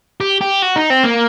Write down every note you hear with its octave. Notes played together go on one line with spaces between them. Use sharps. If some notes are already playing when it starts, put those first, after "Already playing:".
G4
G4
F#4
D#4
C4
A#3